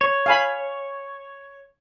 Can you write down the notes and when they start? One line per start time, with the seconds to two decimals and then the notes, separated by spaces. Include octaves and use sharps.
0.01 C#5
0.26 F5 G#5 B5